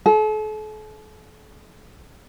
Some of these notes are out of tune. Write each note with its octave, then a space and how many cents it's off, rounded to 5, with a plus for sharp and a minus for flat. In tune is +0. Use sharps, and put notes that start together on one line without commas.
A4 -40